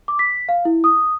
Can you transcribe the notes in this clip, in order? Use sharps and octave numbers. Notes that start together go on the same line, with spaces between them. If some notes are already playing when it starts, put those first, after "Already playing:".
D6
B6
F5
E4
D#6